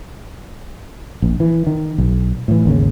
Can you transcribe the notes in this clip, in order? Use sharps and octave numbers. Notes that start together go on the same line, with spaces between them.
A#1
E3
D#3
B1
A2 E3
G#1 D#2 C#3